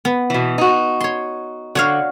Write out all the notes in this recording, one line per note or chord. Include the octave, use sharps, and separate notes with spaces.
B3
B2 E3
D#4 F#4
C#5 C6
D3 F#4 C#5 F5